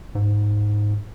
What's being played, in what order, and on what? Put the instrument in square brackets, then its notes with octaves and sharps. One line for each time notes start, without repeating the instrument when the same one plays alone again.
[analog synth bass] G#2